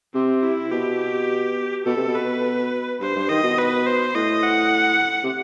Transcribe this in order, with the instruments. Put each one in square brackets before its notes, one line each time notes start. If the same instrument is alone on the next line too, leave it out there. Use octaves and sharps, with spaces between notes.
[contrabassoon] C3 [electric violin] C4
[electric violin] E4
[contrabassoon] B2 [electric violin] G4
[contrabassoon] B2 [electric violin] A4
[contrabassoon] C3
B2
[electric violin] B4
[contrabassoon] G2 [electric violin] C5
[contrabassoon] G2
[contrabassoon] D#3 [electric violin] D#5
[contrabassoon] B2
[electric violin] B4
C5
[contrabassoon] A2 [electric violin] D#5
[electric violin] F#5
[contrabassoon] C3